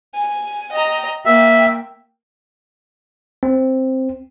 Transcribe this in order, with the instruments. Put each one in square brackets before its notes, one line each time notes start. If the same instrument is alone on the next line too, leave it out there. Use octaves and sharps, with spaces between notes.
[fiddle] G#5
[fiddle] D#5 A#5 [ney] G5
[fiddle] A#3 [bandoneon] E5 [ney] G5
[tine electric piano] C4